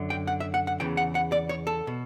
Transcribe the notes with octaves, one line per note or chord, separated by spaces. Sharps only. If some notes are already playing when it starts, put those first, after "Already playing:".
Already playing: F#2 D3
G5
F#5
E5
F#5
F#5
E2 C#3 E3 G5
F#5
F#5
D5
C#5
A4
B2